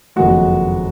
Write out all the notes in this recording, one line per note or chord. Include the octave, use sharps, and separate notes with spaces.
F#1 F2 D#3 G#3 F#4